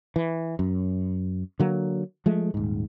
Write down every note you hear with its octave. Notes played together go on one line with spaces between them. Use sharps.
E3
F#2
D3 F#3 A#3
F3 G#3 A3
D#1 G#2